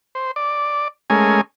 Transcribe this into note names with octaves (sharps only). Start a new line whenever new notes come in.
C5
D5
G#3 A3 C#4 A#4 G#5